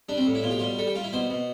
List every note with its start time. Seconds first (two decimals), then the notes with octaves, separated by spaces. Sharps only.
0.09 G3 D4
0.17 C4
0.26 A2
0.35 E4
0.43 B2 F4
0.51 G4
0.59 G3 F4
0.78 G3 A4
0.87 G4
0.95 G3 F4
1.04 E4
1.13 B2 C5
1.30 B2